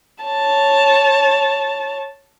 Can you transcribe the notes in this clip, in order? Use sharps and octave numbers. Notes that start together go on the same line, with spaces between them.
C#5 A5